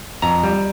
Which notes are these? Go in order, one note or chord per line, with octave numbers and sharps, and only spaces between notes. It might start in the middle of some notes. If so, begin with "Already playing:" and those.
F2 A#5
G3